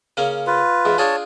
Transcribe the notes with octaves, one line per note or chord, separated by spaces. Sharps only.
C#3 A#3 C#4
F4 B4
E2 G#2
D4 F4 G#4 C#5 A5